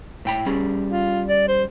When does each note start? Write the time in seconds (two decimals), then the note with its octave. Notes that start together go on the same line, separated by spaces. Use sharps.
0.25 A2 G5 B5
0.46 G3 C#4 G#4
0.91 F4
1.28 D5
1.48 C5